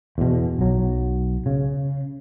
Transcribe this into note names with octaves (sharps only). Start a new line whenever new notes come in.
E2 B2
B1 F#3
C#3